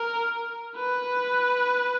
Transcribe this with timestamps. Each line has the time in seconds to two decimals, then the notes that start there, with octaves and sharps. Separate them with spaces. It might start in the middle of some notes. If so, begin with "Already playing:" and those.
Already playing: A#4
0.76 B4